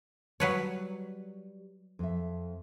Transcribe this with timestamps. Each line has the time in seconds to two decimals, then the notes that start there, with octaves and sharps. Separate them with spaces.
0.40 F#3 G3 B4 C#5
1.99 F2 E5